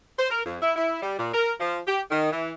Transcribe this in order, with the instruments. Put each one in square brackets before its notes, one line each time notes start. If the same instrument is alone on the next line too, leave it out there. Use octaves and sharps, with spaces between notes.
[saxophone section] C5
A#4
F2
E4
E4
G3
A#2
A#4
F3
G4
D#3
E3